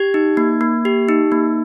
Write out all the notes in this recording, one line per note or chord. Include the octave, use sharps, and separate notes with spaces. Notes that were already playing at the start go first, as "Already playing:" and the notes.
Already playing: G4 G#6
D#4
A#3
A#3
G4
D#4
A#3